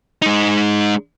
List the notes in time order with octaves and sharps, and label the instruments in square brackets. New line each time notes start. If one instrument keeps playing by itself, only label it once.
[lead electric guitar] G#3 D#4